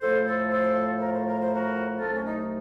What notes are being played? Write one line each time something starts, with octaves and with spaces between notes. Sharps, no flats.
A2 F3 A3 A4 C5
A4 C5
A4 C5
A#4
C5
A#4
C5
F#4 A#4
C2 C3 F#3 A3 F4 A4
C#4
D#4